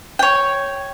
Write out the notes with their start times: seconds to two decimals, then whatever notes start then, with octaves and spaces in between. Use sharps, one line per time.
0.19 C#5 G5